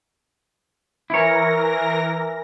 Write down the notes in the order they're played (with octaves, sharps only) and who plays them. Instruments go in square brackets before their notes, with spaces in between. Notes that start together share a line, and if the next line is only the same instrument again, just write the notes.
[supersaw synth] E3 A#4 A#6 [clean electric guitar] E4 C#5